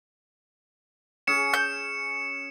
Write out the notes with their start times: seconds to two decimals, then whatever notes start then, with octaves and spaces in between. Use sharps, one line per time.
1.27 C#4 G#4 C#7 E7
1.54 G6